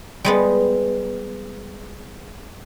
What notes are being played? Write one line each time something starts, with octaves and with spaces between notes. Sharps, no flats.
G3 G#3 B3